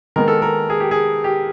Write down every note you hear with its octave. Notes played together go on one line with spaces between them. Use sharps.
D#3 G#3 B3 A#4
A4
A#4
G#4
G4
G#4
G4